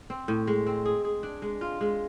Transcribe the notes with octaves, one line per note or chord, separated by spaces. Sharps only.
C4
A2
G#3
C4
G#4
G#4
D4
G#3
F4
G#3